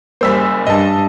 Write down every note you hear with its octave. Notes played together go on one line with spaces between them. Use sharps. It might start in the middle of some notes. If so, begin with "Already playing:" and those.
F#1 G3 A#3 C5 E6 B6
G2 D#5 A5